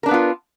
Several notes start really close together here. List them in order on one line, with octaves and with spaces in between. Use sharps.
A#4 D4 B4 B3 F4